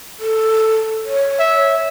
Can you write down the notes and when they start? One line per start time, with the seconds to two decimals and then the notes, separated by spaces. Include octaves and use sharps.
0.19 A4
1.05 C#5
1.39 E5